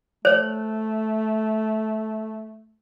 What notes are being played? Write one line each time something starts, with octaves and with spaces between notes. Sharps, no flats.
A3 C5 C#5